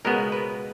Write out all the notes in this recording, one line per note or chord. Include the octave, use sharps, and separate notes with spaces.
C#2 B2 G#3 B3 A#4
B4